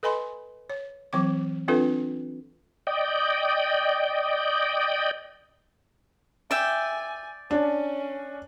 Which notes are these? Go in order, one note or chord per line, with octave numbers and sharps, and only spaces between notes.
A4 B4 D#5 G#5 B5 C6
C#5
E3 F#3 C4 D6
C4 D4 F4 A4 B4
D5 D#5 G5
D5 E5 G5 G#5
C#4 D4